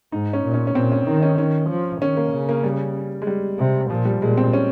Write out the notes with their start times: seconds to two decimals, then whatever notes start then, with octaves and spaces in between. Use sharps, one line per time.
0.12 G#2 D#4
0.33 C#4
0.44 A#2
0.54 C#4
0.67 C#4
0.75 A#2 C4
0.92 C#4
1.07 D#3 D#4
1.23 C#4
1.38 D#3 C#4
1.70 F3
2.02 D#3 C#4
2.17 A#3
2.32 C#3
2.49 A#3
2.64 G3
3.22 G#3
3.27 G3
3.59 C3
3.90 A#2 F3
4.05 G3
4.21 A#2 G#3
4.37 C4
4.53 C#4